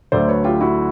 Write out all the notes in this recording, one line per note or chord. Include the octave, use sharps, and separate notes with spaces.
D2 D3 F#3 A3 C5 D5
B4 C#5
F4 G4
E4 F#4